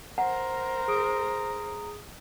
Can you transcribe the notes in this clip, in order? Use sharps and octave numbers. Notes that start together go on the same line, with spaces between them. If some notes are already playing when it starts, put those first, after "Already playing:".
A#4 C5 F#5 A#5
G#4 D#6 D7